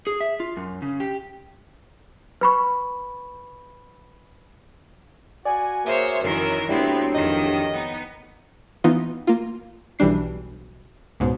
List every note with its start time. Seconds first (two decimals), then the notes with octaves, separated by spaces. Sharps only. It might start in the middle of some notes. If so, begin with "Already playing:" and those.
0.07 G#4
0.21 E5
0.40 F4
0.57 F#2
0.82 C#3
1.00 G4
2.41 B4 B5 C#6
5.45 F#4 D5 G#5
5.85 A#3 G#4 C5 C#5 E5
6.22 F#2 D#3 E3 A#4
6.69 A2 F#3 B3 C4 D4 E4 G4
7.14 F2 D#3 D#5
7.72 B3 D#4
8.84 E3 B3 D#4 F4
9.27 A#3 F4
9.99 B1 E3 G3 D4 C7
11.20 C#2 G#2 B2